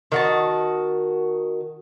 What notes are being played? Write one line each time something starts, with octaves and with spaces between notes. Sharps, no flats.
D#3 F#4 A5